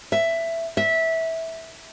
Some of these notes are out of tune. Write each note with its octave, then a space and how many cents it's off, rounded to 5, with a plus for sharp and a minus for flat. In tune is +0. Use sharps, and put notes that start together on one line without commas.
E5 +10
E5 -15